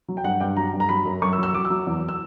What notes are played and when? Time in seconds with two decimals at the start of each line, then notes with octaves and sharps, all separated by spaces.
0.08 F#3
0.17 G5
0.24 G2 F#5
0.40 G2 G5
0.57 F#3 A#5
0.73 G2
0.80 A#5
0.89 F#3 B5
1.05 F#2
1.22 F#2 C#6
1.33 E6
1.38 F#3
1.43 E6
1.54 F#3 D6
1.65 E6
1.70 F#3
1.87 E2
2.09 E6